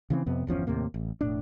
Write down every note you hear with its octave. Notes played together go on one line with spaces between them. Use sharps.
C#3 E3 G#3 C4
F2 C3 B3
G1 E2 F3 C#4
D#2 A2 C3 A#3
A1
E1 A2 D4